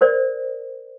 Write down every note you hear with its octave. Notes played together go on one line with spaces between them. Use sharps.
A#4 C5 D5